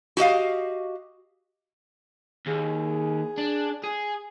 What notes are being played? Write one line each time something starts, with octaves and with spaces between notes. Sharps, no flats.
F#4 G4 D#5 F5
D#2 G#4
D4
G#4